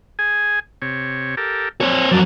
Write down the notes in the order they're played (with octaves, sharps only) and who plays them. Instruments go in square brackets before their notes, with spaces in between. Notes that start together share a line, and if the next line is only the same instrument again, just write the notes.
[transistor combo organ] G#4 G#5
C3 C#5
G4 A4 A#4
[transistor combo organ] F#3 [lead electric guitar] C4 C#5
[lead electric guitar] F2 F#3 [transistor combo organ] D5